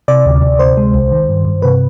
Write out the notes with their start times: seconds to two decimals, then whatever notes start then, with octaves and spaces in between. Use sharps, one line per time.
0.08 C3 D5
0.26 D2
0.42 D2
0.59 C3 C5
0.77 G#3
0.94 C2
1.12 D#3
1.29 G2
1.45 G2
1.62 C3 B4